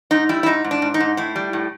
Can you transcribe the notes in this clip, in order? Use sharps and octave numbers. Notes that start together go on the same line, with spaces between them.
G#2 D#4
G3 E4
E4
G#2 D#4
G#2
D4
G#2
D#4
G#2
A2 E4
G3
A2